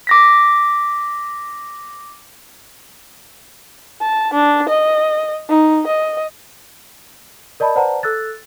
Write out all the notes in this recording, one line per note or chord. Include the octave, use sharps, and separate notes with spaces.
D6 A#6 B6
A5
D4
D#5
D#4
D#5
A#4 D5 D#5 A5 B5
B4 C5 D5 F#5 A5 A#5
A4 E6 F#6 A6